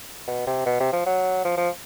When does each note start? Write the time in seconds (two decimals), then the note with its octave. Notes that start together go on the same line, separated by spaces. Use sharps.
0.28 B2
0.47 C3
0.66 B2
0.80 C3
0.93 F3
1.06 F#3
1.45 F3
1.58 F3